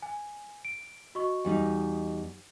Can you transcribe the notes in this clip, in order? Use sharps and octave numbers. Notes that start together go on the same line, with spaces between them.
G#5
D7
F#4 D#5 C#6
E2 G3 D#4